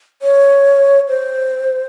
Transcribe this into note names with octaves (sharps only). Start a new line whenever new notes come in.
C#5
C5